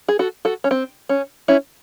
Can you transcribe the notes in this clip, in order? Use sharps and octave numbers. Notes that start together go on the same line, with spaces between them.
G#4
F#4 A4
F#4 A4
C#4
C4
C#4
C#4 E4